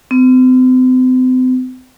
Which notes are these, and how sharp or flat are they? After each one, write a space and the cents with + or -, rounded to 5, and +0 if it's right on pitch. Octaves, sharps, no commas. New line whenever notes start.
C4 -40